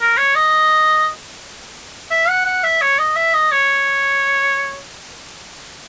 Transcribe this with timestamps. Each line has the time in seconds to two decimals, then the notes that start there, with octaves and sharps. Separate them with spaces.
0.01 A#4
0.18 C#5
0.35 D#5
2.11 E5
2.29 F#5
2.46 F#5
2.64 E5
2.81 C#5
2.99 D#5
3.16 E5
3.34 D#5
3.52 C#5